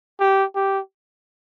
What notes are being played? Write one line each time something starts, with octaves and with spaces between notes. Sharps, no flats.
G4
G4